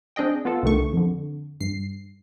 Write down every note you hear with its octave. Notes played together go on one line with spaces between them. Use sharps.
C4 D4 G#4 D#5 G5
B3 F4 A4
C2 D3 D#3 A3 C#6
F2 D3
G2 C7